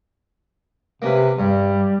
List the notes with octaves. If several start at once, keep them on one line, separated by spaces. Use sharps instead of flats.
C3 A#3 C#4 B4
G2 G3